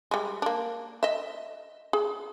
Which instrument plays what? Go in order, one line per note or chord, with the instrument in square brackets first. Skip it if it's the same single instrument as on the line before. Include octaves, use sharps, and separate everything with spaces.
[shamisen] G3 G#3
A#3 D4
D#5 E5
G#4